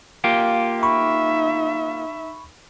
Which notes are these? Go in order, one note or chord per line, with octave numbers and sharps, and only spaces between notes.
A#3 F4 G4
D#4 E5 B5 C#6